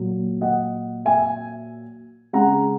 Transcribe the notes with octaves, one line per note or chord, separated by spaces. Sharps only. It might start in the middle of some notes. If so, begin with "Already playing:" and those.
Already playing: A#2 F#3
D#5 F#5
E5 G#5
C#3 G#3 F#5 A#5